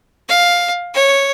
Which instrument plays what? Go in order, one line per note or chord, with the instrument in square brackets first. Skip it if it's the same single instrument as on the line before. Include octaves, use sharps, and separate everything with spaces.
[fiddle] F5
C#5